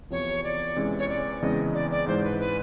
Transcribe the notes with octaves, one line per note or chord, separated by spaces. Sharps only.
E2 C3 F3 C#5
D5
E2 C3 E3 G#3 C#4
C#5
D5
E2 C#3 E3 G#3 C4 D#5
D5
D5
G#2 E3 G#3 C5
B4
B4